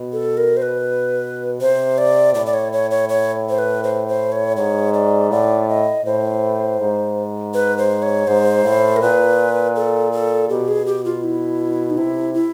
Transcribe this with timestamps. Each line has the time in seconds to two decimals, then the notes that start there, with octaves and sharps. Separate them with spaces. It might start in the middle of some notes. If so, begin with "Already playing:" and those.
Already playing: B2
0.13 A4
0.37 A#4
0.57 C5
0.62 B4
1.61 C3 C5
1.98 D5
2.35 A2 D5
2.46 D5
2.54 C#5
2.73 C#5
2.91 C#5
3.09 C#5
3.49 C5
3.59 B4
3.84 C5
4.08 C5
4.32 C#5
4.57 G#2 C#5
4.94 D5
5.31 A2 D5
5.69 D#5
6.05 A2 C5
6.80 G#2
7.54 B4
7.78 C5
8.02 C#5
8.28 G#2 C5
8.65 A2
8.96 A#4
9.01 A#2 B4
9.76 A4
10.12 A4
10.50 B2 G4
10.68 G#4
10.86 G4
11.05 F4
11.24 E4
11.90 D#4
11.97 C3 E4
12.34 E4